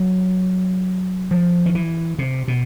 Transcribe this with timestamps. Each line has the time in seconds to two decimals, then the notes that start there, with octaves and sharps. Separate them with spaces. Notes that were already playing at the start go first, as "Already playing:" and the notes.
Already playing: F#3
1.31 F3
1.66 D#3
1.75 E3
2.19 C3
2.48 B2